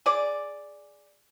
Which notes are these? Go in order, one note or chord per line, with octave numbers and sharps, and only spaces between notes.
G#4 D5